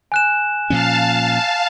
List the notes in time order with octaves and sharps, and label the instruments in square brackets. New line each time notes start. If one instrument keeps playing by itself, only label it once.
[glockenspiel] G#5 F#6 E7
[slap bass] A#2 F3 C#4 [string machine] F5 A5